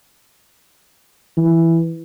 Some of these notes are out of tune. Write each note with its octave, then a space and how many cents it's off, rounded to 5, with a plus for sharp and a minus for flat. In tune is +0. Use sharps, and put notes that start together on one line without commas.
E3 +5